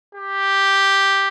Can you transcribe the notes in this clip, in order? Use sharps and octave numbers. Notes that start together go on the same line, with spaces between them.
G4